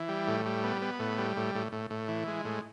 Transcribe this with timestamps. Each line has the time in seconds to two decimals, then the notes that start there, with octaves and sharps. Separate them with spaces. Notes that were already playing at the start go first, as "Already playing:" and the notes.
Already playing: E3
0.08 G3
0.28 A2
0.46 G3
0.64 B3
0.82 B3
0.99 A2
1.18 G3
1.37 A2
1.55 A2
1.72 A2
1.90 A2
2.08 E3
2.28 G#3
2.45 A2